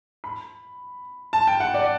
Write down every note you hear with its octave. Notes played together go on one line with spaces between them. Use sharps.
B5
A5
G5
F#5
D5